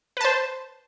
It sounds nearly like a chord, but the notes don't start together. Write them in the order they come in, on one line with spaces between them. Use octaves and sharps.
B4 A5 C5